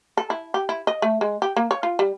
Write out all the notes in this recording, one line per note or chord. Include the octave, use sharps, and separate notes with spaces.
A4
E4
G4
E4
D#5
A3
G#3
G4
A#3
C#5
F4
G3